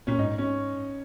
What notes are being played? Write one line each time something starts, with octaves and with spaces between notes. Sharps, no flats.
A#2 C#4
G#2 D#4
C#4